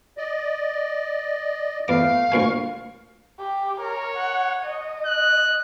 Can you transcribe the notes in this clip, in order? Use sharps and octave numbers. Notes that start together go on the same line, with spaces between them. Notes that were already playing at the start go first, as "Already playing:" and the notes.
D5 D#5
E2 A3 F5 D6
D2 A#2 G#5 C#6
G4
A#4 C#5
F#5
D#5
F#6